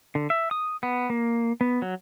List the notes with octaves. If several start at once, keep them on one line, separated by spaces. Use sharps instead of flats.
D3
E5
D#6
B3
A#3
B3
F#3